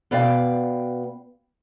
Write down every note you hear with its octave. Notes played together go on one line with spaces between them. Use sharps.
B2 B3 D5 F5 G5